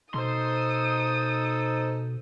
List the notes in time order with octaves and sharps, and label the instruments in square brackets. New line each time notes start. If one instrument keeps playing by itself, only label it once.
[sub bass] B2 [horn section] D#4 A4 [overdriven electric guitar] C5 C6 [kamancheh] D#6